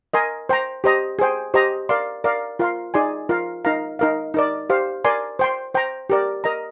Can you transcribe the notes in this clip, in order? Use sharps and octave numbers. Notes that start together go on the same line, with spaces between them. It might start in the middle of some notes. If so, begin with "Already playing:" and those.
A#4 D#5 G#5 C6
C5 G5 A#5
G4 C5 D#5 A#5
G#4 C5 G5
G4 C5 D#5 A#5
A#4 D5 F5 C6
A#4 D5 F5
F4 A#4 F5 C6
D#4 G#4 D5 G#5 C6
F4 A#4 F5
D#4 A#4 F5 A#5
D#4 A#4 F5
D#4 A#4 D5
G4 C5 F5
A#4 D5 G#5 C6
C5 G5 C6
C5 G5 A#5
G4 A#4 D5
A#4 D#5 A#5